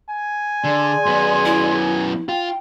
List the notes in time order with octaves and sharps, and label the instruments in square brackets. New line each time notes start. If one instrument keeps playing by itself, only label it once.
[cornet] G#5
[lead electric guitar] D3 [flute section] G#4 D5 C6
[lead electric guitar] F#2 B3
[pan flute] E4
[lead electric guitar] F4 [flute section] G5